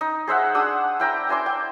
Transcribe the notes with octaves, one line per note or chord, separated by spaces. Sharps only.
D#4
G#4 C5 E5 F#5
D4 F#5 D#6 E6
E4 G5 A#5
E5 G#5 C6 D6
G5